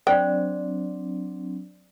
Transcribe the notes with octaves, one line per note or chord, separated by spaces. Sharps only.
F#3 C4 D4 C5 D5 G5